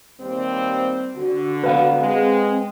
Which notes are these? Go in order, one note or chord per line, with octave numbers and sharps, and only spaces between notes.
D#2 G3 C4
D3 F#4
B4 F5 F#5
G#3 C4